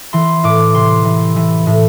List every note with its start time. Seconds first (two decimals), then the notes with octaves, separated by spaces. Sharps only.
0.13 E3 C6
0.44 A2 D6
0.74 C3 C6
1.05 E3
1.36 E3
1.67 A2